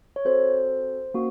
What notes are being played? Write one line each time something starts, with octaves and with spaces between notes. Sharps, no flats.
C#5
C4 F#4 A4 C5
A#3 C#4 F#4